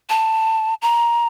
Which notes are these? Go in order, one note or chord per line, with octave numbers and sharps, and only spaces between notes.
A5
A#5